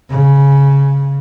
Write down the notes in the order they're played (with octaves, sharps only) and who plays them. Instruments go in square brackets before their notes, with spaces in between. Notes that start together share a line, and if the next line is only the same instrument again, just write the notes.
[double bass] C#3